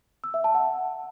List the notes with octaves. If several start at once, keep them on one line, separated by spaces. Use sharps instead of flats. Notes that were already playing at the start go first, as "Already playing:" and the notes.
E6
E5
A5
F#5